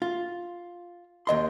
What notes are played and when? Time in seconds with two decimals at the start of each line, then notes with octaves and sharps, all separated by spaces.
0.02 F4
1.27 D#2 D#5 C6